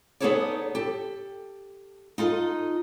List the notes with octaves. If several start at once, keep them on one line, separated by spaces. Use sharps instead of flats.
B3 D#4 G#4 A4 C#5 D5
G4 A4
D#4 F4 A4